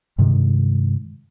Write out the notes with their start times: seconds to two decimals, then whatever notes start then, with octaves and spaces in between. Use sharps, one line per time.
0.18 G2 C3 D#3 G#3